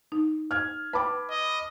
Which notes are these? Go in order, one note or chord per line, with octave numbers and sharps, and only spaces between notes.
D#4
F6 G#6
B4 G5 A5 B5 D6
D#5